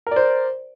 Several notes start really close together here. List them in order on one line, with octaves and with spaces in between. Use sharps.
A#4 D5 C5